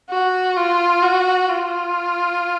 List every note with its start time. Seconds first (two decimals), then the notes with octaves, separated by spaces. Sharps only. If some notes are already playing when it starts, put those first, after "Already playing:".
0.10 F#4
0.57 F4
1.02 F#4
1.48 F4